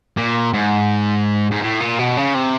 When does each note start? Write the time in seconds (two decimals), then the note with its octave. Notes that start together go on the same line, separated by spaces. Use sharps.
0.17 A#2
0.54 G#2
1.51 G#2
1.62 A2
1.80 A#2
1.99 B2
2.17 C#3
2.34 C3